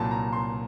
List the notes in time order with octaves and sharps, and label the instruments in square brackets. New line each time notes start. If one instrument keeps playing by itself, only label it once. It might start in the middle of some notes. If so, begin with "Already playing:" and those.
Already playing: [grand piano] C2 A#2 F#3 A5
A#5
C6